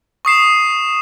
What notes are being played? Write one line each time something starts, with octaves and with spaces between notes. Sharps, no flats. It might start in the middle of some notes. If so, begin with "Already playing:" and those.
C#6 D#6 C7 E7